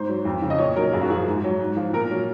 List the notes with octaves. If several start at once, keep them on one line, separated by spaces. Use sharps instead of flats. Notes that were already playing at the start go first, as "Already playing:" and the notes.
Already playing: G#2 C5
F#3
F2
C#3 F3
D#5
A#2 C#5
F#3 A#4
F#2 G#4
F#4
F3 G#4
G#2
F#3
G#2
F3
A#2 A#4
F#3